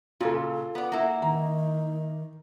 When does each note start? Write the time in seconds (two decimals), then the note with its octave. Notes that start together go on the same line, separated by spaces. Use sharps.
0.20 A#2 C#3 F4 A4
0.75 B3 D5 F#5
0.92 A#3 E4
1.22 D#3 A#5